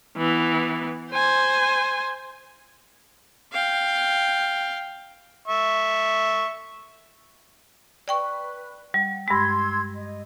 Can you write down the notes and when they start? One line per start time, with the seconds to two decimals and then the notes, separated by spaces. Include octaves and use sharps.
0.17 E3 B3
1.11 C5 G#5
3.52 F5 G5
5.48 E5 C#6
8.08 B4 D5 G5 C#6
8.94 G3 F#5
9.28 G2 G#3 C6 E6 G#6
9.95 D#5